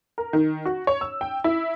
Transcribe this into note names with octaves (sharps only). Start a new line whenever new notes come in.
A#4
D#3
F#4
C#5
E6
G5
E4